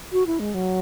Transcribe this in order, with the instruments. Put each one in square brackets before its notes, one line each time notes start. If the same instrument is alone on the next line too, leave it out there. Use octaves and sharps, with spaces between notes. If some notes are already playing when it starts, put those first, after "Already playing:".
[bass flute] F#4
E4
G#3
F#3